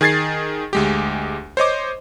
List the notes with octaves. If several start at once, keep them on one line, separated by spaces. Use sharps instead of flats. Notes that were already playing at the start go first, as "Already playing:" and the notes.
D#3 G#4 G#6 A6 C7
D2 G#3 G4
C5 C#5 D#5 D6